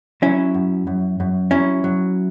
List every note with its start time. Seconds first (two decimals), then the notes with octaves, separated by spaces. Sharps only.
0.22 F#3 C#4 E4
0.54 F#2
0.87 F#2
1.20 F#2
1.51 F#3 C#4 E4
1.84 F#3